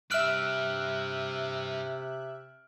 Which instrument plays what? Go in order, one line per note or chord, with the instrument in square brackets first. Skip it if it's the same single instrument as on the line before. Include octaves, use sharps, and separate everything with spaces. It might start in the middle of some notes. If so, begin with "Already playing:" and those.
[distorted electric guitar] G2 [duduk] C3 [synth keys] E5 F#6 [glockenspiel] F6 D7